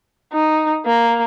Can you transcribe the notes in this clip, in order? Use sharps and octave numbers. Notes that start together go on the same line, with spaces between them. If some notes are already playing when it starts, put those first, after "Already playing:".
D#4
A#3